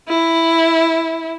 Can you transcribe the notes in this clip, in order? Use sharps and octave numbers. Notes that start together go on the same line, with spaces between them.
E4